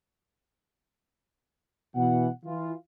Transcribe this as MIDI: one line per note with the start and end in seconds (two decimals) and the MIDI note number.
1.95 2.28 47
1.95 2.28 52
1.95 2.28 78
2.45 2.73 52
2.45 2.73 65